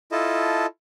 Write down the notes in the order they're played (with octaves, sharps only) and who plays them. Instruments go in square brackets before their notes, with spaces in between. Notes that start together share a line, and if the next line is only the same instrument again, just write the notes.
[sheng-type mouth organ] E4 F4 A4 D#5 A5